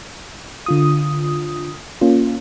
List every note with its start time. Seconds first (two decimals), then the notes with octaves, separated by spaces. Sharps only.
0.66 D3 F4 D#6
2.01 A#3 C#4 F4